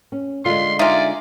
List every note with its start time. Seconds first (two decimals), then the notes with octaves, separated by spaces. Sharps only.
0.12 C#4
0.45 D3 G#3 F4 C6
0.79 D#4 F4 D5 E5 G#5